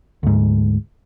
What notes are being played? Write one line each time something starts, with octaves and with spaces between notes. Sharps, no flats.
D2 G#2